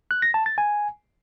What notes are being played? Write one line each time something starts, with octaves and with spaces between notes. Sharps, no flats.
F#6
A#6
A5
A6
G#5